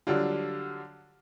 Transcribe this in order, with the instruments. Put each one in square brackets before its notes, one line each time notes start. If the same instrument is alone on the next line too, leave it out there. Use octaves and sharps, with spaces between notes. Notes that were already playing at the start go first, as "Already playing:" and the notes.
[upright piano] D3 F#3 G3 D4 F4